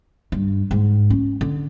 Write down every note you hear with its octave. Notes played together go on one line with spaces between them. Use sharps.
G2
G#2
C#4
D3